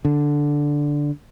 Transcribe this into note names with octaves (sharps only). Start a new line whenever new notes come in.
D3